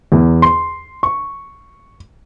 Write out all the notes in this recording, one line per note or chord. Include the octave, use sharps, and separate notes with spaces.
E2
C6
C#6